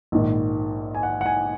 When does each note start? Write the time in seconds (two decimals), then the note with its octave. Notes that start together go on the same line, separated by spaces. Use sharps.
0.12 A#1 G#2 D#3
0.95 G#5
1.03 F#5
1.21 F#5
1.26 G#5